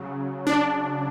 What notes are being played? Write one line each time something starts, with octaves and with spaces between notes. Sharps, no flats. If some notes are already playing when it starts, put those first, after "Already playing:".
Already playing: C#3 F#3
D4